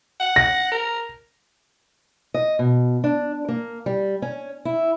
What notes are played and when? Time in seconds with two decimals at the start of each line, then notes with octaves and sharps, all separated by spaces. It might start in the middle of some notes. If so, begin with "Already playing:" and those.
0.20 F#5
0.36 A#6
0.72 A#4
2.34 D#5
2.59 B2
3.04 D4
3.49 A#3
3.86 G3
4.22 C#4
4.65 E4